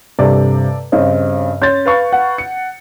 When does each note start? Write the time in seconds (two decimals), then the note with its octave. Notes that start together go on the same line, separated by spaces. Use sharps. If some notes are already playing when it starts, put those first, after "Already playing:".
0.19 G2 C3 A4 D5
0.92 G2 C#3 C4 C#5 D#5
1.62 C#4 C6 G6 A6
1.86 B4 F5 C#6
2.13 F#5
2.38 C#7